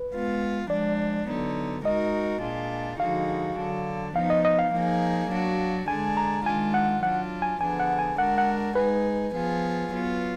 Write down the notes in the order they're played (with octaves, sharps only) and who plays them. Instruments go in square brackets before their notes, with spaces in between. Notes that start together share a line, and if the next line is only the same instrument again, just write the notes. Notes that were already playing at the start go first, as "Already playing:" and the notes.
Already playing: [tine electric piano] B4
[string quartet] G#3 B3 F4
[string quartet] F3 G#3 D4 [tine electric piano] D5
[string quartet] D3 F#3 B3 D#4
[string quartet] G#3 D#4 F#4 A#4 [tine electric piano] D#5
[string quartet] A#2 G#3 D4 F4
[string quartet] D3 F3 G#3 D#4 F#4 [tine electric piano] F5
[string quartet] D3 F#3 D4
[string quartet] F3 B3 D#4 [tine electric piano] F5
[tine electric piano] D#5
D#5
F5
[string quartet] F3 A#3 D#4 G#4
F#3 D4 F#4
[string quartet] D3 G#3 D4 G#4 [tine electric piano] G#5
[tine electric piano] A#5
[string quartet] D#3 G#3 D4 F4 [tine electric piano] G#5
[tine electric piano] F#5
[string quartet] F#3 D4 F4 [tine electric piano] F#5
[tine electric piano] G#5
[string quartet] D3 F3 B3 D4 G#4 [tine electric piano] G#5
[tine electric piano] F#5
G#5
[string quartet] G#3 D4 F#4 A#4 [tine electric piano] F#5
[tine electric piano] F#5
[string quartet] G#3 D#4 G#4 [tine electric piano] B4
[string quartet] F3 B3 F4 G#4
F#3 B3 F4